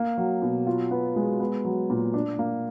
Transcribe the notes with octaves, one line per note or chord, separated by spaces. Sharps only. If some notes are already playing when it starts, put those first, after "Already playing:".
Already playing: A#3
F#3
B2
F4
B3
G#3
B3
F#3
A#2
D4
A#3